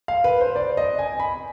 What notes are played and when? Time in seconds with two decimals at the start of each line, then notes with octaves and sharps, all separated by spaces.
0.08 F5
0.24 B4
0.41 C5
0.56 D5
0.77 D#5
0.99 G#5
1.20 B5